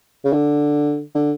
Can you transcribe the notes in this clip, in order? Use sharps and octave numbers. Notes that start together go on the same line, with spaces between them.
C#3
D3
D3